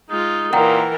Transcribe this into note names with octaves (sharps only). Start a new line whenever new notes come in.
G#3 D#4 F4
A#2 E3 A#4 F#5 G5 A#5